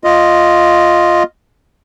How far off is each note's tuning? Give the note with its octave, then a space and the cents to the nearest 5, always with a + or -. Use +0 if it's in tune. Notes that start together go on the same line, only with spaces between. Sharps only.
F4 +0 D#5 +0